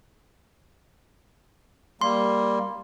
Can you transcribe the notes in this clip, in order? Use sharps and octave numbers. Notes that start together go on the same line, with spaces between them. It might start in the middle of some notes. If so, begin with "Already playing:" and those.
G3 A#3 C6